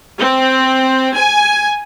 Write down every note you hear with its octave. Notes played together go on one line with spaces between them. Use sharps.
C4
G#5